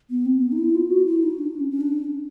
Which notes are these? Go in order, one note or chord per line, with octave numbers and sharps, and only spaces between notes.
B3
C4
B3
D#4
E4
F4
F#4
E4
D#4
D4
C#4
C#4
D4